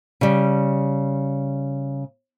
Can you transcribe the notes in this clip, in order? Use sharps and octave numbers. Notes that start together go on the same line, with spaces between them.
C#3 G3